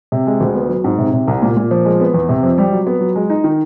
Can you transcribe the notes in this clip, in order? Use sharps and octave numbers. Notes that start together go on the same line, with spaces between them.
C3
G#3
D2
B3
F#3
G#2
C3
C3
C2
A#2
A#2
F3
G#3
B3
E2
C3
F2
G3
F#3
B3
F#3
G#3
D#4
D#3